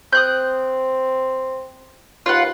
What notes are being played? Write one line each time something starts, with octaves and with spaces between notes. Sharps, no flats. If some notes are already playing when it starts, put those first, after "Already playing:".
C4 D#6 F#6 G6
D#2 F4 B4 F#5